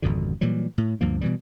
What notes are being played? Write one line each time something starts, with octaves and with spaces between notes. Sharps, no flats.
G#1 F2 B2 D3
A#2 E3 F#3 G3
A2
D2 G2 F3 A#3
B2 E3 G3